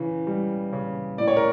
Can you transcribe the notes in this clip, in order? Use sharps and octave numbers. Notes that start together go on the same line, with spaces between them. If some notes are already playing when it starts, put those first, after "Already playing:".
Already playing: C#3 E3
G3
C#3
A2 D5
C#5
A#4